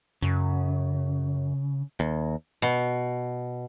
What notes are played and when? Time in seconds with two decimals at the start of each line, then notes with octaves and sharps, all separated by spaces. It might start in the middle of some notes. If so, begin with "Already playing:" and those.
0.22 F#2 C#3
2.00 D#2
2.62 B2